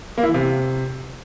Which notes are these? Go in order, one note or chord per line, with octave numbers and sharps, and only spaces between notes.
A#3
E4
E3
C3